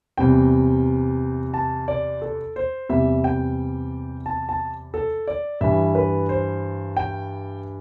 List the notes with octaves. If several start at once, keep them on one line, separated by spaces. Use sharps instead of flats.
E2 C3 G3 G5
A5
D5
A4
C5
E2 C3 G3 E5
G5
A5
A5
A4
D5
G2 E3 G3 E5
B4
C5
G5